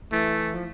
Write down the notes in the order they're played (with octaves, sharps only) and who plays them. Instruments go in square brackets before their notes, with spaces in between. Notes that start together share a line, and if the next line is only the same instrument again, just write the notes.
[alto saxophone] E3 [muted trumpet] A3
[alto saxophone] F3